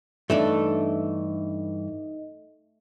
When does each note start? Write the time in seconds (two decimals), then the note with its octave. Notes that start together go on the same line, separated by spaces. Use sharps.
0.30 G2 E3 A3 D4 D#4 D#5